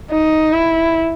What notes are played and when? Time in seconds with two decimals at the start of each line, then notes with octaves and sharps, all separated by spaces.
0.11 D#4
0.53 E4